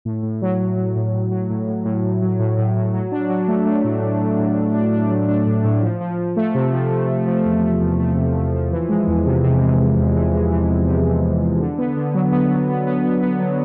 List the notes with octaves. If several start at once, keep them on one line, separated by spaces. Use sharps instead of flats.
A2
A2
F#3
F#3
F#3
A2
A2
F#3
A2
A2
A2
A2
F#3
A2
A2
A2
F#3
D4
F#3
A3
A3
A2
A2
A2
A2
F#3
D4
D4
F#3
D4
A2
A2
F3
F3
F3
A3
C3
F3
F3
C3
F3
E2
A3
E2
A3
C3
A3
F3
E3
G#3
E2
C3
C3
E3
C3
E2
E3
G#3
E3
C3
C3
E3
E2
E2
D3
B3
D3
F#3
B3
F#3
B3
B3
B3
B3
F#3